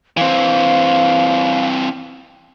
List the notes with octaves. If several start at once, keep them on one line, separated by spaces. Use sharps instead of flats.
E3 C4 F5